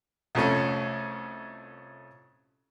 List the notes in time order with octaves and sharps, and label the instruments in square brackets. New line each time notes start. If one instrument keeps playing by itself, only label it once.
[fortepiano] C2 F2 A3 C#4